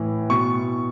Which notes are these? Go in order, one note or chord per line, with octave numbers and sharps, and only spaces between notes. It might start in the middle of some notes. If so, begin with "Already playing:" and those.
Already playing: A2 E3
B2 C#6